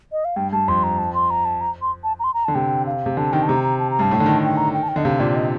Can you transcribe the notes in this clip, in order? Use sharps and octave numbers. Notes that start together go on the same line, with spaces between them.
D#5
F5
G2 G5
G2 A5
F2 C6
A#5
A5
C6
A#5
A5
A#5
C6
A5
A#5
C6
A#5
D3 A5
C3 G5
F5
C3
D3 A5
D#3 G5
A5
C3 A#5
A#5
A5
A#5
G2 A5
A2
D3
D#3
G5
A#5
G5
A5
G5
D3 D#5
C3 F5
A#2 D5
D#5